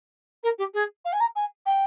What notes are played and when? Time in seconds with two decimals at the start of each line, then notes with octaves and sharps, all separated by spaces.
0.43 A#4
0.58 G4
0.74 G#4
1.05 F5
1.13 G#5
1.20 A#5
1.36 G#5
1.66 G5